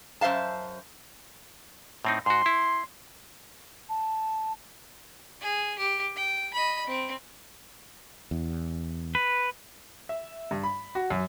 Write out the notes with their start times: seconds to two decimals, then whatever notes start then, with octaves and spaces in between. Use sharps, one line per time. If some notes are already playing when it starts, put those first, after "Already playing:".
0.21 F#2 C5 E5 F5 A5
2.05 A2 C4 D#4
2.26 G#2 F#4 C6
2.46 E4
3.89 A5
5.41 G#4
5.79 G4
6.16 G5
6.54 D#5 B5
6.87 C4
8.31 E2
9.15 B4
10.09 E5
10.51 G2
10.64 B5
10.95 F#4
11.10 F#2